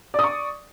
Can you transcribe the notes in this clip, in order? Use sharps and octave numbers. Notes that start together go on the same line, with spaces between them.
D5 C#6 D#6